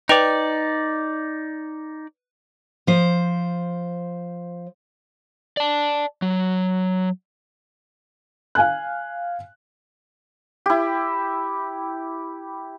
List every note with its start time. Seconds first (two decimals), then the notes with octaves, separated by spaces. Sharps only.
0.09 D#4 B4 D5 G5 F7
2.87 F3 C5
5.57 D5 A5
6.22 F#3
8.55 F5 G#5 F#6
10.66 E4 G4